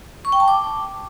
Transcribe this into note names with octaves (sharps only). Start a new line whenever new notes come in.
C#6
G5
A5
D6